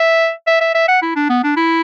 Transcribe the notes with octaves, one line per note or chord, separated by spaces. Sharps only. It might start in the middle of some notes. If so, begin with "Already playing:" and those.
Already playing: E5
E5
E5
E5
F#5
E4
D4
B3
D4
E4